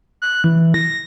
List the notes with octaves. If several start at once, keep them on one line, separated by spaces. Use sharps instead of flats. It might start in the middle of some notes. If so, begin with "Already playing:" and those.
F#6
E3
A#6